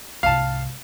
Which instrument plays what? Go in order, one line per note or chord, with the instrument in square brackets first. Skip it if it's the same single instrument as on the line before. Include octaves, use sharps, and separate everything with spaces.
[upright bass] C2 G#2 [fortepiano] F5 A5